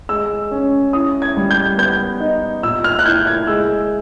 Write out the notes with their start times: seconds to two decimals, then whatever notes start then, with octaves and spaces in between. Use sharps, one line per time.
0.09 G#3 E6
0.51 C#4
0.93 E4 D#6
1.22 G#6
1.37 G3
1.51 G6
1.78 B3 G6
2.20 D#4
2.63 A#2 E6
2.84 F6
2.99 F#6
3.05 E4 G6
3.27 G#6
3.47 G#3 E6